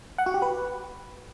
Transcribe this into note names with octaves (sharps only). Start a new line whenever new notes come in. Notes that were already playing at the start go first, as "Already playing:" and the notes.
F#5
F#4
G4
B4